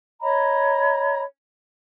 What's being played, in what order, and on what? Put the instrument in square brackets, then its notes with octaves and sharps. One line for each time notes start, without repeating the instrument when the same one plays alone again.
[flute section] C#5 D#5 A#5 B5